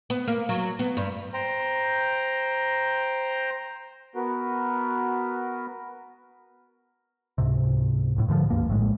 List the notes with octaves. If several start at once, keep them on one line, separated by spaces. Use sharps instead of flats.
B3
A#3
F#3
B3
G2
C5 G5 A#5
B3 F#4 A#4 B4
C#2 G#2 C3
D1 A1 A2
G#2 D3 D#3 F3
C#2 G2 A#3
A#1 A2 G#3